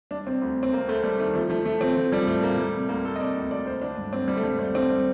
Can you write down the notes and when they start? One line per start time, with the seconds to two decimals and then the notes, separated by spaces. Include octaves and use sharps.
0.11 G3 D4
0.26 C3 C4
0.42 D2
0.57 C3
0.63 C4
0.73 C3 A#3
0.88 D2 A3
1.04 G3
1.19 D#3 A3
1.35 F3 A3
1.50 F3 A3
1.65 F3 A3
1.80 F3 C4
1.97 F3 A3
2.12 F3 G3
2.27 A2 A3
2.43 A2 A#3
2.58 G3 A3
2.74 C3
2.89 D2 A#3
3.04 D2 A4
3.16 D#5
3.20 C3 D5
3.36 D2
3.51 D2 D5
3.66 D2 C5
3.82 D3 D4
3.97 G2
4.13 G2 C4
4.28 D3 G3
4.37 A3
4.43 G2 G3
4.59 G3 A3
4.75 D3 C4
4.90 G3